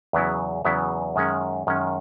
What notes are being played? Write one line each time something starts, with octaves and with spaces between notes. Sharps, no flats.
E2 C#3 F#3 B3 E4
E2 C#3 F#3 B3 E4
F#2 D#3 G#3 C#4
F#2 D#3 G#3 C#4